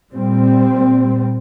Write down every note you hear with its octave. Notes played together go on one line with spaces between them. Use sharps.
A#2 G3 C4